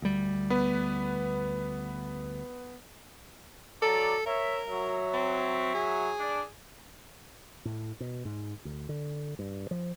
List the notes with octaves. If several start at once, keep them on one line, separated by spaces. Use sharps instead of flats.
D2 G3
B3 B4
F#3 A4 D5 A#5
A#4 C#5 E5
F#3 E5
C4
G#4
D4
A2
B2
G#2
D2
D3
G2
F3